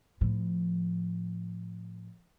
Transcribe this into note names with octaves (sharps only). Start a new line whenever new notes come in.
A2 F3